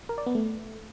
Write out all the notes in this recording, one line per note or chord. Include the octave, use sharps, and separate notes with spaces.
A#4
D5
B3
A3